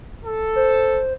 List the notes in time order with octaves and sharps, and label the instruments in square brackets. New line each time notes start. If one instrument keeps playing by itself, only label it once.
[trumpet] A4
[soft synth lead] C5